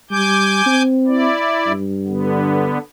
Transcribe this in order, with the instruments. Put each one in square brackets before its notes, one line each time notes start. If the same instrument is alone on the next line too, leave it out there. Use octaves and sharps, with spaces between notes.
[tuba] G3 [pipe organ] G#5 D6 G6
[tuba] C4
[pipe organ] E4 D5
[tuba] G2
[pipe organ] D3 B3